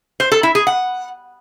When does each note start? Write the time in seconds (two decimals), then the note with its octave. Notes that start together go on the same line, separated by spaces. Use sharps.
0.20 C5
0.32 A4
0.43 E4
0.55 G#4
0.67 F#5